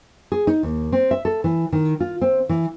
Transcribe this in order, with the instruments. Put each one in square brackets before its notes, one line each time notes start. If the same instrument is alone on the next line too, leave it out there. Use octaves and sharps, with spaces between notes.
[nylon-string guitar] G#4
D#4
D#2
C4
E5
A4
E3
D#3
F4
C4
E3